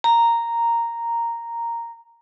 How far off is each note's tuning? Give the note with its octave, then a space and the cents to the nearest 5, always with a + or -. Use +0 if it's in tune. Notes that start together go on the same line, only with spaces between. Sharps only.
A#5 -5